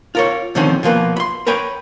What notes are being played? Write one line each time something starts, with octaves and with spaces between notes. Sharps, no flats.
F4 A#4 C#5
B2 D3 D#3 F3 C4 C#4
B2 F3 A#3 B4
B5 C6
A#4 B4 C#5 G5 B5